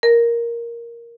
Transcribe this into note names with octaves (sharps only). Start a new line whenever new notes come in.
A#4